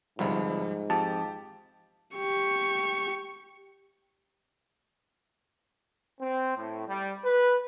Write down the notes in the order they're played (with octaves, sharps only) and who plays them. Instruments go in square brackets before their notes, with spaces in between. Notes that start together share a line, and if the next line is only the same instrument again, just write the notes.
[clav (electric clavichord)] G1 C2 [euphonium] G#2 [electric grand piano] F3 G3
[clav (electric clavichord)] F2 [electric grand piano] G4 [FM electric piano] A5
[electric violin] G4 C#6
[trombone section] C4
A2
G3
B4